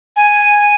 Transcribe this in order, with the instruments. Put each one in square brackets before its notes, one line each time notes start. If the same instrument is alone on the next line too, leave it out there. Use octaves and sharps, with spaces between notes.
[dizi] G#5